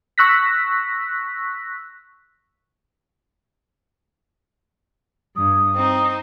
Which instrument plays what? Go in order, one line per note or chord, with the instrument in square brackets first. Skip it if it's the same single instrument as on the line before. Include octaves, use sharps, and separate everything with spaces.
[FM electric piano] C#6 E6 F#6 A#6 B6
[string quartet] G2 [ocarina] D#6
[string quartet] C4 D#4